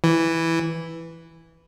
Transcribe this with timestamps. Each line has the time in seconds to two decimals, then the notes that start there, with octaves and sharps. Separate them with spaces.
0.04 E3